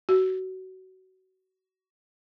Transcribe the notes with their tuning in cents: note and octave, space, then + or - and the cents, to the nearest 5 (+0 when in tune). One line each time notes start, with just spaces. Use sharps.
F#4 +25